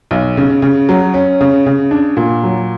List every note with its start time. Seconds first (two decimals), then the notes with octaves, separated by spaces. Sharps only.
0.11 B1
0.37 C#3
0.62 C#3
0.89 F#3
1.14 C#4
1.41 C#3
1.66 C#3
1.91 D4
2.17 A#2
2.43 F#3